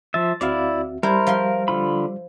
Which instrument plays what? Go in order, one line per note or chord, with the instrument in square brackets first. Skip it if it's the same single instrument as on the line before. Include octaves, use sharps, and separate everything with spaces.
[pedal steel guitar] F3 E5 [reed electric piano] A6
[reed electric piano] D2 C4 F#4 [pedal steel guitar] E4 D5 [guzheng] E5 F5
[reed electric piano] G3 [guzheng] E4 C5 [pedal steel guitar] A#4
[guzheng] F3 F5 C6
[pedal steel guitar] D3 F4 B5